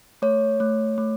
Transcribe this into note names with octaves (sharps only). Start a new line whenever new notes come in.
A3 C#5
A3
A3